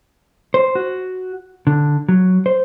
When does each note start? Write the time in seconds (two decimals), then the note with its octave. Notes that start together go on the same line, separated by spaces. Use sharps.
0.54 C5
0.75 F#4
1.67 D3
2.09 F#3
2.46 C5